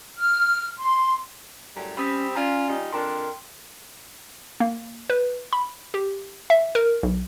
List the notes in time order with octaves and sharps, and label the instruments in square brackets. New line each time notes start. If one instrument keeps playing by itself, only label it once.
[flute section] F6
C6
[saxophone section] F#2 A2 G3
[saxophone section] G3 C4 [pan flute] C#4 [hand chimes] B5 D#6 B6
[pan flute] C#4 [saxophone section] F4 [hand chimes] D5 G#5 A#5
[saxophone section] G3 D#4 F4
[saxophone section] F2 D4 [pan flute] A#4 [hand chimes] G5 A#5 C6
[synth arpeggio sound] A#3
B4
B5
G4
E5
A#4
B1